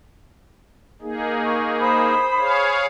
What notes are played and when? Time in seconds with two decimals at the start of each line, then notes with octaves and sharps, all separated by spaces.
1.02 A#3 D#4 G#4
1.44 C#6
1.79 C5 B5 D#6
2.39 G#4 C#5 F5